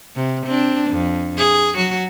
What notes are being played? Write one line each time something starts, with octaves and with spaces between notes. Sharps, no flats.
C3
C4 D4
F2
G#4
F#3 F#4